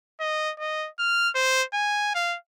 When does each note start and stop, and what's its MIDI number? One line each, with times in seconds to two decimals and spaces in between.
0.20 0.52 75
0.60 0.88 75
0.99 1.29 89
1.35 1.63 72
1.73 2.10 80
2.15 2.37 77